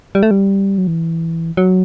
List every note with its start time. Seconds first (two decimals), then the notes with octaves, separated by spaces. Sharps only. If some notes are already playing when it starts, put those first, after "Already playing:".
0.15 G3
0.23 A3
0.31 G3
0.78 F#3
0.87 E3
1.57 F#3